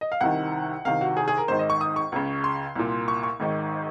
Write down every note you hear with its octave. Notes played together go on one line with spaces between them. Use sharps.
D#5
F5
C2 C3 D#3 F#5
C2 C3 D#3 F5
F#4
G#4
G#4
A#4
G#1 G#2 D#3 C5
D#5
C#6
D#6
C#6
C#2 C#3
C6
C2 A#2
C#6
C#6
G#1 G#2 D#3